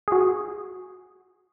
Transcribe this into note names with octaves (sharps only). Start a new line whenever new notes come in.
F#4 G#4